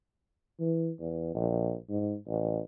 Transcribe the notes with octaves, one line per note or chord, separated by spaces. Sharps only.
E3
E2
A#1
G#2
A1